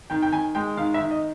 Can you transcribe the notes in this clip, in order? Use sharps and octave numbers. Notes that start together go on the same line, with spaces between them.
D#3 G5
G5
D#3 G#5
G#3 G5
D#3 F5
E5
D#3
D#5